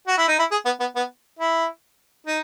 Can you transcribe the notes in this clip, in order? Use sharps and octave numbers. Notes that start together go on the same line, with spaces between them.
F#4
E4
D#4
E4
G#4
B3
B3
B3
E4
D#4